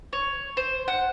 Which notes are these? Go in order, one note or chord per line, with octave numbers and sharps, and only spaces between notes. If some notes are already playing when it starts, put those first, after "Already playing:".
C#5
C5
F#5